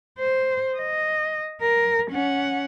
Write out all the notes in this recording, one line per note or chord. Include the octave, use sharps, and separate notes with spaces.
C5
D#5
A#4
C#4 F#5